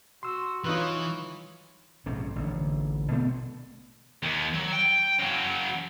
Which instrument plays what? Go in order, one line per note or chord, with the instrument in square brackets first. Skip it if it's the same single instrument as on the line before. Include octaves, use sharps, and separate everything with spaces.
[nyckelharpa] F#4 [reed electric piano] C6 E6
[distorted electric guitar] E3 [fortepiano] D#4 F4 B4 [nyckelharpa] C#5
[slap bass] A#1 G#2 C3 C#4
A1 D3
B2 A3 B3 C4
[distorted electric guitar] D#2
F#3
G5
C#3 F#3